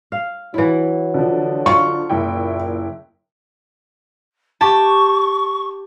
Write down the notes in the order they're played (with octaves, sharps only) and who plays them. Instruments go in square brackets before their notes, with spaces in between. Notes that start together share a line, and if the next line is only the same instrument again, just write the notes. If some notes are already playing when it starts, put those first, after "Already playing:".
[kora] F5
[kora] E3 E4 [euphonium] F#3
[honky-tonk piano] D3 F3
[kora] D#4 F4 [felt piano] C#6
[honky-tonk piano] F#1 E4 G5 [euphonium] A#2
[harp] G4 A5 [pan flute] C#6